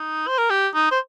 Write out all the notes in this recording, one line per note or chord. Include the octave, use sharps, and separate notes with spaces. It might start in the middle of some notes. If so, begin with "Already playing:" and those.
Already playing: D#4
C5
A#4
G4
D#4
C5